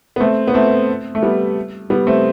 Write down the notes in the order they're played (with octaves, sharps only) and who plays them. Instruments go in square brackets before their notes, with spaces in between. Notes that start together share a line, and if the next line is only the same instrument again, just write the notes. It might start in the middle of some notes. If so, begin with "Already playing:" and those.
[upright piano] B3
A3 C4
B3
A3 C4
A3
G3 B3
G3 B3
A3 C4